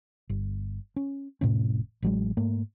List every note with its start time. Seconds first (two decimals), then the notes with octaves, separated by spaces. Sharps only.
0.29 G1
0.96 C#4
1.41 F1 A2 C3 C#4
2.03 A1 F#3 G#3
2.37 G#2 A3 A#3